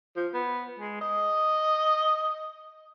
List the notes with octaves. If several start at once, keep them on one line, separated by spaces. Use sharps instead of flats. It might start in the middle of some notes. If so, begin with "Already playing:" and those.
F3
B3
G#3
D#5